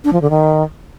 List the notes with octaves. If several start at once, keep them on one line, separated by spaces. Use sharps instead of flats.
D4
F3
D3
D#3